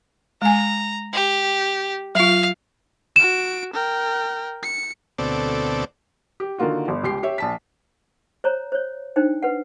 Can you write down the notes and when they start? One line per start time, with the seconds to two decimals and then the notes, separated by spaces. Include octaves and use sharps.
0.42 G#3 G#5 A#5
1.14 G4
2.15 F#3 F4 F5
3.16 F#4 D7 E7
3.73 A#4 G5
4.63 C#7
5.18 D2 B2 C4 A4 D5
6.40 G4
6.58 D3 D#3 A#3 F4 F#4
6.88 G1
7.03 C#2 G4 C7
7.23 G4 C#5 E5
7.38 A#1 A5 B6
8.44 C5 C#5 A#5
8.72 C5 C#5
9.16 D4 D#4 C5 G5
9.43 B4 F#5